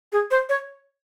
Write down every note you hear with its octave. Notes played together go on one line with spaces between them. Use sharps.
G#4
C5
C#5